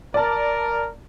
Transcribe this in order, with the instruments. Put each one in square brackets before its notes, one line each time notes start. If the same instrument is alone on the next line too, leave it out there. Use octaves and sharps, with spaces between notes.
[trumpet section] A#4 [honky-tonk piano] D5 A5